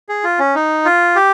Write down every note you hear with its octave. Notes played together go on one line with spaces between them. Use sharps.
G#4
F4
C#4
D#4
F4
G4